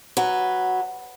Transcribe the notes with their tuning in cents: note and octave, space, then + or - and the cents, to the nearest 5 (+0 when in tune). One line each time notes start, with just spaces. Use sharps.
F#3 +0 B4 +0